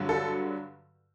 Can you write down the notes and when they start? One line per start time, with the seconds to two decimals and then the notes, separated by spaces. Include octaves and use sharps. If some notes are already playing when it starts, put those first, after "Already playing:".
Already playing: G2 D3 F#3
0.09 A4